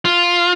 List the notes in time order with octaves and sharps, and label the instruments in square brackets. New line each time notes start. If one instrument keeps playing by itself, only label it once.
[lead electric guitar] F4